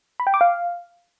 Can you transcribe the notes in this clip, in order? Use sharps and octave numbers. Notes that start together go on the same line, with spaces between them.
B5
G5
D6
F5